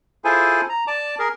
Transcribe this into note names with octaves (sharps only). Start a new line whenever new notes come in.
E4 F4 G#4 A4 C5 G#5
A#5
D5 A5 D6
G#4 A#4